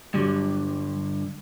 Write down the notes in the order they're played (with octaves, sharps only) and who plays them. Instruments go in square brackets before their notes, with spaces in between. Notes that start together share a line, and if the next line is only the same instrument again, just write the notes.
[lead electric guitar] G2 D3 [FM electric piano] F#3 G3